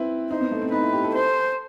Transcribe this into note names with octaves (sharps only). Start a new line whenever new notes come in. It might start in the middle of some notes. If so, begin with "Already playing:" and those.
Already playing: C4 E4 B4
D#4 C5
B3
A3
C4
D#4 B4
E4
G4
A4
C5